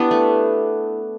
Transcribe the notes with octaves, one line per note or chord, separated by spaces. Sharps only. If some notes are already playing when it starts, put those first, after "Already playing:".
Already playing: B3 D4 E4 G4
A3